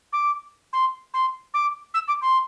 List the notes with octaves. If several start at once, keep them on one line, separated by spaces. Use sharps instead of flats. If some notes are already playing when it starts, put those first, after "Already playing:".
D6
C6
C6
D6
E6
D6
C6